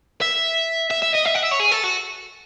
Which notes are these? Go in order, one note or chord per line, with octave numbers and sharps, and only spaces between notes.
E5
E5
E5
D#5
E5
F#5
E5
C#5
G#4
A4
F#4